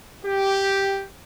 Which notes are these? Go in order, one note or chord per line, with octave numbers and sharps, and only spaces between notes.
G4